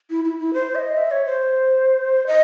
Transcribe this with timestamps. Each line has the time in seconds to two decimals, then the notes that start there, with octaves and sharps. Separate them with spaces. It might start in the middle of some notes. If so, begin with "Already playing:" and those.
0.10 E4
0.25 E4
0.39 E4
0.54 C5
0.75 E5
0.79 D#5
0.97 E5
1.11 C#5
1.26 C5
2.27 D#5